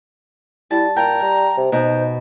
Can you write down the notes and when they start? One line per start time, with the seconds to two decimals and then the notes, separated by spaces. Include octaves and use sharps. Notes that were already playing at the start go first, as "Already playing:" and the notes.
0.71 G3 E4 A5
0.97 A#2 G5 A#5
1.22 G3
1.58 C3
1.72 B2 D#4 C5